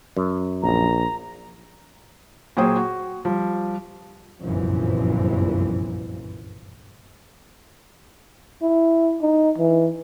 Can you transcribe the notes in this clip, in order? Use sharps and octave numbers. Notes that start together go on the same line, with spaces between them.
F#2
A#1 A#5
A#2 F#3 G#4 C5 G5 D#6
F#4
F3 G3
G1 C2 F#2 A#2 E3 F3
E4
D#4
E3